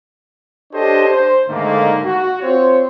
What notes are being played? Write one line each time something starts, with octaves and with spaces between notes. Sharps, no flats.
D4 G4 A4 C5 C#5 D#5
C5
G#2 D3 D#3 A3 A#3
F#4
C4 F4 C5 C#5